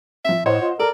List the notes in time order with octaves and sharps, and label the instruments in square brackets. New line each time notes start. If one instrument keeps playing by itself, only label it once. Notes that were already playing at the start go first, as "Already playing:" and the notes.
[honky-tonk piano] F3 C4 [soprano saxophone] E5
[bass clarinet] A2 [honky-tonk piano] C5 D#5 F#5 [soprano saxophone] C#5
[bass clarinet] F4
[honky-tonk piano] A4 [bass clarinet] A#4 [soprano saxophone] D5